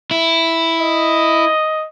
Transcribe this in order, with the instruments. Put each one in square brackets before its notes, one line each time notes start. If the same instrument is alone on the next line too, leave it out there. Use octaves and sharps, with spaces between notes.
[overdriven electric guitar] E4
[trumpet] D#5